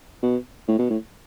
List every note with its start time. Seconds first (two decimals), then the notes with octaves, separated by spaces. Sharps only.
0.23 B2
0.68 A2
0.78 B2
0.90 A2